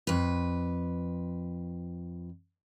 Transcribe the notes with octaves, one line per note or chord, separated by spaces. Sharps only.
F2 B4